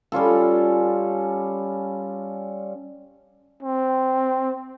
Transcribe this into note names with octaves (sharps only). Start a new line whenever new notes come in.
G3 C#4 F4 A4
C4